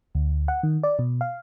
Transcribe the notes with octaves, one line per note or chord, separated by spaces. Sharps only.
D2
F#5
D#3
D5
B2
F5